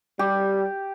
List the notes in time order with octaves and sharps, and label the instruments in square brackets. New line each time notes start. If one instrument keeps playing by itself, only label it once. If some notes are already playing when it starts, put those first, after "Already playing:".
[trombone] G3 [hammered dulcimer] G4